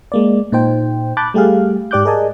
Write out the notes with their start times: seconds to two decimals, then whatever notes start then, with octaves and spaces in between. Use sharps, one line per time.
0.12 G#3 A#3 D5
0.52 A#2 D#4 C5 G5
1.17 A5 B5 D6 F#6 G6 A6
1.34 G3 A3 G4 G#4 F5
1.91 G#2 G4 D5 D6 F#6 G6
2.05 G#4 A#4 D5 D#5 G#5 A5